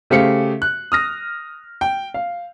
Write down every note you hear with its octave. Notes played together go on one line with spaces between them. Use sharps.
C#3 A3 G4 C5 F5 C#7
F#6
D#6 F6 A#6
G5
F5